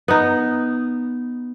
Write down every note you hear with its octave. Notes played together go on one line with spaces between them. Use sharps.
B3 D#4